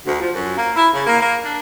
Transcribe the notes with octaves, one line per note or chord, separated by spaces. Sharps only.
D2
F3
F#2
A#3
E4
C#3
A#3
A#3
D4